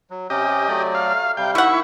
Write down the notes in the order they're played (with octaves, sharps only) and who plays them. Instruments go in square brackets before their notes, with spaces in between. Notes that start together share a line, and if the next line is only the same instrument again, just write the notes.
[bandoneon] F#3
[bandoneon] C3 C#4 [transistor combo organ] G4 D#5
[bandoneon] F#3 A3 D5
[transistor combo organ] F5
[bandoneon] C3 G3 F5 [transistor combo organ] G5
[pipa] D#3 F#5 [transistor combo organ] E4 C#6 [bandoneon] E5